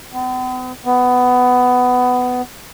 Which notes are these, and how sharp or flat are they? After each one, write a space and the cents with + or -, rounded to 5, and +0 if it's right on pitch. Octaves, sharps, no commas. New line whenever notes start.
B3 +45
B3 +15